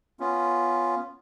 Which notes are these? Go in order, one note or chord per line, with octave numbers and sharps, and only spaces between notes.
B3 C#4 F4